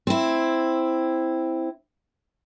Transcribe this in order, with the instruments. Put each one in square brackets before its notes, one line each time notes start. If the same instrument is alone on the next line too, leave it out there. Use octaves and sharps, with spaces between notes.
[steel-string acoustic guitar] C4 E4